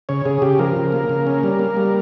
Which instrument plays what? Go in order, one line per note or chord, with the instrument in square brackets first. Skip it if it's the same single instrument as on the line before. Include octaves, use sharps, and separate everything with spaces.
[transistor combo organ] C#3 C#5
C#3 G#4
C#3 G4
F3 A#4
C#3
A#3
C#3
C#4
G3
A#3
G3